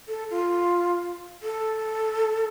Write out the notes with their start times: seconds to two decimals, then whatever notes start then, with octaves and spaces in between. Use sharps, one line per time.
0.08 A4
0.31 F4
1.43 A4